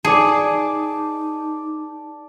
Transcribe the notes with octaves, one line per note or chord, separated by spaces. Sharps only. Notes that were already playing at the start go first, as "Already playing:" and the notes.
D#4 G#4 D5 A5